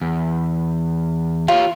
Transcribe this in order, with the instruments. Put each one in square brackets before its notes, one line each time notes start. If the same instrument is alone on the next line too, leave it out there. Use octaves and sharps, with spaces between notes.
[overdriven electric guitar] E2
[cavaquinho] F4 [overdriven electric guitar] G4 C#5